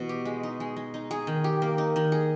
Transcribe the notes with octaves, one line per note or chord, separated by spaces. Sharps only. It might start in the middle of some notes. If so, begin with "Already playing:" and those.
Already playing: B2 E3
G4
G#3
D#4
G#3
G#3
D#4
G#4
D#3
G4
A#3
D#4
D#3
G#4